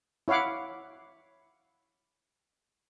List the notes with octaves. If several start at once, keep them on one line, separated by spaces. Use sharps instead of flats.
E4 C#5 F5 F#5 D6